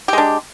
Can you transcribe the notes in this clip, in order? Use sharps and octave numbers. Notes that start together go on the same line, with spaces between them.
G#3 D4 G4